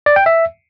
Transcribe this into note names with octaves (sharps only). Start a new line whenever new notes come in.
D5
G5
E5